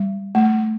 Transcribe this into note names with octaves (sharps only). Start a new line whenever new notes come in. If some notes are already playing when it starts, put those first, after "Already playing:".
Already playing: G3
A3